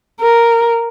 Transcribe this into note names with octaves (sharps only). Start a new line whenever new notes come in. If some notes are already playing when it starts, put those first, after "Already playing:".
A#4